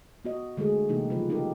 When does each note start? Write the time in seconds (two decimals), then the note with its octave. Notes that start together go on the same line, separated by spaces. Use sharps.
0.25 B3 F#4 D#5
0.57 D3 G#3 A3 F#4 G#4
0.89 C3 E3 A#3 D#4 G4
1.10 C#3 F3 G3 F4 B4
1.29 C#4 D#4 G4 A4 A#4